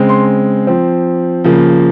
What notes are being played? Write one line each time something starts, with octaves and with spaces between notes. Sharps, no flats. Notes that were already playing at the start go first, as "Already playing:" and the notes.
Already playing: C#3 G#3 C4
C6
F3 C4
C#3 F3 A#3